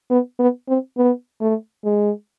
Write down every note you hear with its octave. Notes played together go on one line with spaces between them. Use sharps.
B3
B3
C4
B3
A3
G#3